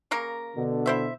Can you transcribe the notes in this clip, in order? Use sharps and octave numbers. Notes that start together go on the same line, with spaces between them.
C#3 A#3 A#4
B2 D3
E4 C5 E5